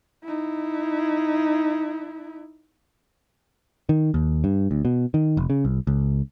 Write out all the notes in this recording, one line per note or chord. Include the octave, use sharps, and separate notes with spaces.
D#4 E4
D#3
D#2
G2
D2
B2
D#3
F1
C#3
C2
C#2